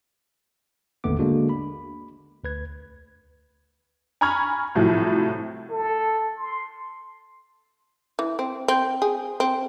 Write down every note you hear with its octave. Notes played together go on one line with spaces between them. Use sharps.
G#1 D#2 D3 A3 B3 D6
D3 G#3 A#3 D4 F#4
B5
D2 B4 G#6
G#5 A#5 B5 C#6 F6 G#6
C2 A2 F3 F#3
A4
C6
E3
C4
C4
G#4
C4